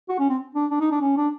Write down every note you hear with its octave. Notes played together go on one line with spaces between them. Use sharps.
F#4
C#4
C4
D4
D4
D#4
D4
C#4
D4